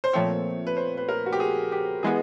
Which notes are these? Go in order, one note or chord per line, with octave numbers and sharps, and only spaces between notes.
C5
A#2 F3 A3 C4 C#5
B4
C5
B4
A#4
F#4
G4
G#4
G4
E3 G#3 B3 G#4